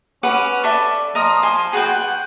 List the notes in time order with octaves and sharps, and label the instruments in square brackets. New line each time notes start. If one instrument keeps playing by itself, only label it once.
[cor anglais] C#4 [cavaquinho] B4 F#5 D6
[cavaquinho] A4 E5 [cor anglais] D5
[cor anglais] F3 [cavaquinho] A#4 D#5 D#6
[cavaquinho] G#5 C6
[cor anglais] F#4 [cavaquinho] G#4 B4 G5
[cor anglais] F#5 [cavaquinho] G5